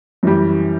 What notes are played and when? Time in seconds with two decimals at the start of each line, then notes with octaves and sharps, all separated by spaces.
0.23 F#2 E3 G3